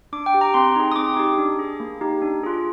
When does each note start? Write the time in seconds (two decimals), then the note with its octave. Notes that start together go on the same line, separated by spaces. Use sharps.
0.13 D4 D6
0.26 G5
0.34 G4
0.41 A#5
0.54 C4 C6
0.76 D#4 G#4
0.92 D#6
0.96 C4 D6
1.17 D#4 G4
1.38 D4
1.59 G#4
1.80 A#3
2.01 D#4 G4
2.22 D4
2.43 F4 G#4